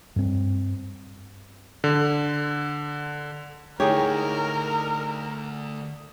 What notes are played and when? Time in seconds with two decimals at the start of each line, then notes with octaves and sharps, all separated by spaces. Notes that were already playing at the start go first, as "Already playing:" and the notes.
0.16 G2 C4
1.84 D3
3.80 D2 A2 D#4 G4 G#4 A#4 C#5